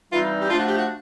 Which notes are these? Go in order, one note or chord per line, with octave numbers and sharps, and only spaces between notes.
E3 G3 C4 D#4 F4
G4
F3 A3 D4 F4
F#4
G4
F#4